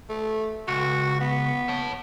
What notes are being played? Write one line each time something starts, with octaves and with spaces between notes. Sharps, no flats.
A3
C#2 F#4
B3
C#5 A5